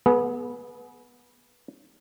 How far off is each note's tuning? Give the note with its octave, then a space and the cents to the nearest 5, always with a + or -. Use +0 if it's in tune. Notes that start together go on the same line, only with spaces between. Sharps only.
B3 -15 G#4 +30